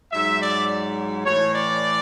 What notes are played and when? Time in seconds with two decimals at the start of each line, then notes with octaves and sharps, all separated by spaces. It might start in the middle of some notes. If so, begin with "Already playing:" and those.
0.12 G#2 F#3 E5
0.40 D5
1.25 A2 E3 C#5
1.54 D5